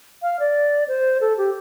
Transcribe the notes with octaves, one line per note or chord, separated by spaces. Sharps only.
F5
D5
C5
A4
G4